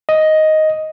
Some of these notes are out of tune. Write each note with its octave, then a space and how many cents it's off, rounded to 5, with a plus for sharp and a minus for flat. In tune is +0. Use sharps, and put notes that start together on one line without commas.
D#5 +5